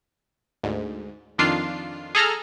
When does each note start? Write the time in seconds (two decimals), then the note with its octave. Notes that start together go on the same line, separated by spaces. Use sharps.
0.64 D2 G#2
1.38 F2 D#3 D4 F4 C7
2.15 G#4 A4 A#5 F6